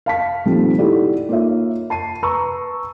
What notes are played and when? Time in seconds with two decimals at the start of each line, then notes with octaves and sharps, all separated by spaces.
0.06 F5 A5 B6
0.45 A#2 D#3 F3 G3 A3 C4
0.78 D#4 E4 F#4 G4 A4 D5
1.29 A#3 D#4 F4 C#5 E5
1.90 A5 C7 D#7
2.23 B4 A5 A#5 C#6 E6